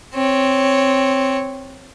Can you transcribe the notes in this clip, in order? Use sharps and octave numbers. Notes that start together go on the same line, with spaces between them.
C4 C#5